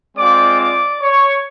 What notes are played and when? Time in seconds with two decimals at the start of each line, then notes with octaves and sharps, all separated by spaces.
0.17 G#3 C4 F4 D5 D6
0.59 D5 D6
1.01 C#5 C#6